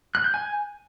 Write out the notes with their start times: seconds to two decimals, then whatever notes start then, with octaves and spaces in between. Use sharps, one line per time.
0.15 F#6
0.24 G6
0.34 G#5